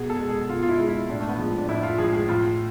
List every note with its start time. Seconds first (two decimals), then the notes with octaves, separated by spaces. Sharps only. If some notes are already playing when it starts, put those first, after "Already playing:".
Already playing: B2 G#4
0.10 A4
0.19 G#3
0.29 G#4
0.49 B2 F4
0.63 F4
0.69 E4
0.78 G#3
0.88 E4
1.09 A2 D4
1.21 A3
1.29 B3
1.39 F3 G#3
1.58 D4
1.69 A2 E4
1.83 F4
1.98 F3 G#3 G#4
2.13 G#4
2.28 A2 F4